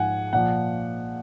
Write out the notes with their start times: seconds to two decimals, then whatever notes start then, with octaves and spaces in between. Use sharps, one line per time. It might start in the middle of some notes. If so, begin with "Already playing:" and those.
Already playing: G#2 F3 F#5 G#5
0.33 A#2 F3 F#5